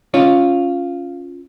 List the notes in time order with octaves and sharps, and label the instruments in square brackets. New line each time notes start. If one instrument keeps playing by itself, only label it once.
[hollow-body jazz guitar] C#4 F4 C#5